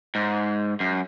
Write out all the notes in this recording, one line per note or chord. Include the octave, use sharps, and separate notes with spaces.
G#2
F#2